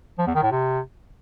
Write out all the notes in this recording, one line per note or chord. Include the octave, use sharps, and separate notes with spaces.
F3
E2
D#3
A2
C3